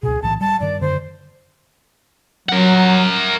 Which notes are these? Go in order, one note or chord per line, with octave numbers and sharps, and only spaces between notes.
C#2 B2 G#4
B1 A2 E3 A5
G3 A5
G2 D#3 D5
F#2 D3 D#3 C5
F#3 A#4 F#5